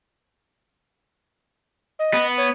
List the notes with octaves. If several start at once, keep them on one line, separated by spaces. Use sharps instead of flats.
D#5
B3
C#5